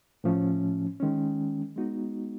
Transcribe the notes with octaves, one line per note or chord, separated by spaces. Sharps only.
A2 F3 A3 C#4
D#3 G#3 C#4
G#3 B3 D#4 F#4